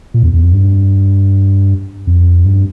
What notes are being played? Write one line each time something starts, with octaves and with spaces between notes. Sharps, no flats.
A#2
E2
E2
F2
G2
F2
G2